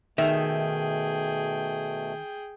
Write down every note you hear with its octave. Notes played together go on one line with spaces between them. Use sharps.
B2 D#3 A3 G#4 E5 G5